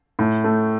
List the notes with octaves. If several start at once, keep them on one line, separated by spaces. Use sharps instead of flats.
A2
A3